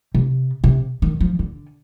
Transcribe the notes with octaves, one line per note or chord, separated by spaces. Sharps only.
C3
C3
D#3
F3
D3